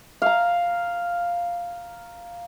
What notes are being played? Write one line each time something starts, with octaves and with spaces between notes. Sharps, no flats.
F5 A#5